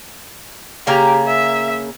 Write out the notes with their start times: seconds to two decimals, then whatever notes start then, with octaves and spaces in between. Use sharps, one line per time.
0.87 C#3 A#3 G4 A#5
1.27 E5